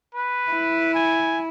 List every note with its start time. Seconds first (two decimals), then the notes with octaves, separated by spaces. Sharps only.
0.15 B4
0.51 E4
0.94 G#5